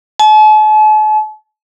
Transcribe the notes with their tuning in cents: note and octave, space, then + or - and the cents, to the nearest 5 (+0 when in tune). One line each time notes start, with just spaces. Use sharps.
A5 -45